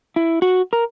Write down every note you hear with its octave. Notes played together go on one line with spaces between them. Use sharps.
E4
F#4
A#4